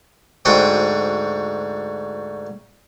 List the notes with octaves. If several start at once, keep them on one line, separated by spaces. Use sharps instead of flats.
D2 G#2 F#4 C5 G5 D#6